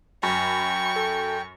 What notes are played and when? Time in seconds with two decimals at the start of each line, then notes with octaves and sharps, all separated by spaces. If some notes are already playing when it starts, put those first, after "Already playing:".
0.23 F#2 G5 B5 C#6
0.96 A4